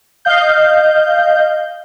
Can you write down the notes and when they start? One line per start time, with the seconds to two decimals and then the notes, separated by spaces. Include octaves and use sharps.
0.25 D#5 F5 G6